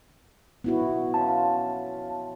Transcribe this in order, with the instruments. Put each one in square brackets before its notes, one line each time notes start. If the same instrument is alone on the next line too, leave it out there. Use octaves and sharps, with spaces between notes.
[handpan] B3 E4 F#4
[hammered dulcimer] F3 C#4 F4 [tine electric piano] A5